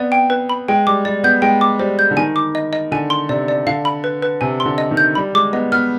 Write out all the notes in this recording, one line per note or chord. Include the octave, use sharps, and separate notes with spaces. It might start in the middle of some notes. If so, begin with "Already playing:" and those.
Already playing: B3 C4 D5
G5
B4
B5
G#3 G5
G3 D6
G3 D5
B3 G6
G#3 G5
D6
G3 C5
G6
D3
D#3 G#5
D6
D#5
D#5
D3 G#5
C6
C3 D5
D5
D3 F5
B5
B4
B4
C3 G#5
C6
D3
D#5
D#3
G6
G3 B5
G#3 D6
B3 D#5
B3 F6